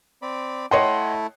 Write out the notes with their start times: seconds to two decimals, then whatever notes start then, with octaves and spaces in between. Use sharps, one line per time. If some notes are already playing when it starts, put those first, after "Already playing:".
0.22 C4 D5 B5
0.71 A3 E4 C#5 D#5 F#5 G5 C6